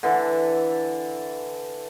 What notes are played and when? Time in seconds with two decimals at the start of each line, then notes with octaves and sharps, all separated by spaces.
0.03 D3 E3 A4